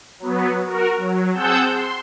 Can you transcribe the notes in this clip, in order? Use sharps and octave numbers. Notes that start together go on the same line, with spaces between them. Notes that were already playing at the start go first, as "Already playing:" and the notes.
F#3 B3
F#4 A#4
F#3
C4 G#4 F#5 A5 E6 G6
C6